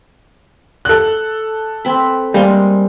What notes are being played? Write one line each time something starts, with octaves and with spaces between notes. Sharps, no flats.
A4 F#6
C4 B5
G3 G#3 A#3 C4